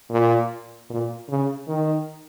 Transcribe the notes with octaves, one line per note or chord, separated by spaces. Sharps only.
A#2
A#2
C#3
D#3